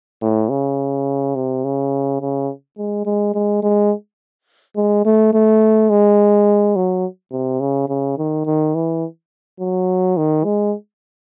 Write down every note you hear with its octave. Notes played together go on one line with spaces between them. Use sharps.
A2
C#3
C3
C#3
C#3
G#3
G#3
G#3
G#3
G#3
A3
A3
G#3
F#3
C3
C#3
C#3
D#3
D#3
E3
F#3
D#3
G#3